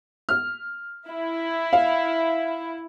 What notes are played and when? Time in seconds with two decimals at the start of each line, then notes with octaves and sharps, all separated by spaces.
0.29 F6
1.10 E4
1.73 F5